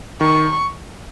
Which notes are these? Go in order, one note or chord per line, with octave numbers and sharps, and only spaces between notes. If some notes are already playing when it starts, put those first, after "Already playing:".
D#3 C#6